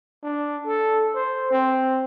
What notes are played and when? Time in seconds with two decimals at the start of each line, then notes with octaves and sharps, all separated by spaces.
0.23 D4
0.66 A4
1.15 C5
1.51 C4